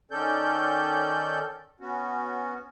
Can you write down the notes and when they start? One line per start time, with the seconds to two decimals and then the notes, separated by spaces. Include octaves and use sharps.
0.11 D#3 C#4 A4 D5 G6
1.80 B3 C#4 F#4